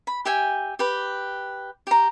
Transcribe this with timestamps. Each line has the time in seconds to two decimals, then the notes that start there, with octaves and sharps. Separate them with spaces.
0.07 B5
0.25 G4 E5 G5 G#5
0.79 G4 B4
1.87 G4 A#5